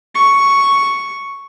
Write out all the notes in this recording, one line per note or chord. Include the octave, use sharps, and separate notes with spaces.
C#6